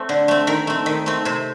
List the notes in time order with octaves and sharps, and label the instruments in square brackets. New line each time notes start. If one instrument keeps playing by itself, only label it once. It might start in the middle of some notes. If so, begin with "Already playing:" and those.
Already playing: [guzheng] A3 C4
D3
A3 C4
D#3 A#4
A3 C4
D#3
A3 C4
C3 C5